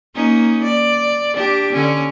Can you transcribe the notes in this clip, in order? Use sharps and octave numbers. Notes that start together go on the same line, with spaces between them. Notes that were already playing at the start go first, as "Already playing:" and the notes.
A#3 C#4 D#4
D5
D4 G4
D3 C#4